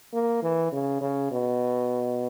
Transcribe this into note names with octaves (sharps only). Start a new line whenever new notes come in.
A#3
E3
C#3
C#3
B2